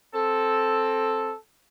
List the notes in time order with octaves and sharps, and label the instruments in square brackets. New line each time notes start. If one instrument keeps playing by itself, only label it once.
[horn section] C4 A4